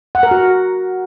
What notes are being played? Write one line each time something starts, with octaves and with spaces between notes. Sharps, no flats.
F#5
A#4
F#4